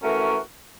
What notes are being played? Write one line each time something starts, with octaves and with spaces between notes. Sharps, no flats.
E3 A3 C#4 F#4 A#4